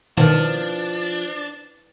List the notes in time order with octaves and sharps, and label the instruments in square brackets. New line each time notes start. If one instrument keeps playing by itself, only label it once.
[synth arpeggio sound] C2 B2 D#3 [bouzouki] F3 [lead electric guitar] D4 [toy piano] E4 B4